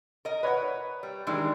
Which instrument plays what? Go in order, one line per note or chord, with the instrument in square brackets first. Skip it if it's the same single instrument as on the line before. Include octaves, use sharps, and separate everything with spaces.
[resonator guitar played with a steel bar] A#4 D#5
[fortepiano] B4 C#5 F#5
[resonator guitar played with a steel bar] G3
[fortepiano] D#3 D4 [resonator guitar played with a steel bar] E3 G3 G#3